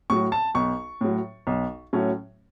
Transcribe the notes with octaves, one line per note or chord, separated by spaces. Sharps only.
A2 F#3 C#6
A5
B1 C#6
A2 F#3
B1
A2 F#3 A3 C#4